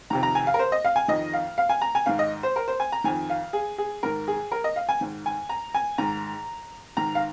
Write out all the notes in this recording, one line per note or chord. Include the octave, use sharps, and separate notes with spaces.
F2 C3 D#3 A#5
A#5
G#5
F5
A#4
C5
D#5
F5
G#5
F2 D#3 D#5
F5
F5
G#5
A#5
G#5
G#2 D#3 F5
D#5
C5
A#4
C5
G#5
A#5
F2 D#3 G#5
F5
G#4
G#4
G#2 D#3 A#4
G#4
A#4
D#5
F5
G#5
G#2 D#3
G#5
A#5
G#5
G#2 D#3 A#5
G#2 D#3 A#5
F5